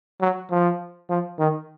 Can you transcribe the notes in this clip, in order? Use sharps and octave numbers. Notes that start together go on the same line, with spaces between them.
F#3
F3
F3
D#3